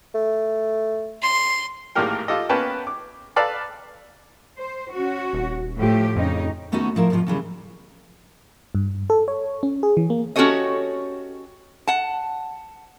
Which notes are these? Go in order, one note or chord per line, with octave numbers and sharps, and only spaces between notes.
A3
C6
G#1 A2 A#3 G4 A#4 G5
F4 G4 A4 D#5
A#3 B3 C#4 B4 G5 A5
D6
A4 B4 D5 F5 A5 A#5
C5
C#4 F#4
D#1
A2 F3 G4
F2 C#3 D#4
D#2 A3 B3 C#4 D#4 F#4
A2 F3 E4 A#4
F2 A2 C3 D#3 F3
E2 C#3 E3 G3
G2
A4
C#5
C#4
G#4
E3
A#3
C#4 F#4 G4 A4 C#5 D#5
F#5 A5